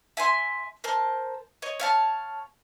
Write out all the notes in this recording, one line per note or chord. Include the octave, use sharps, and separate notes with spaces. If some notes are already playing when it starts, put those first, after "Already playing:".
E5 G#5 C6
A#4 C5 A5
C#5 D#5
C#5 F5 A5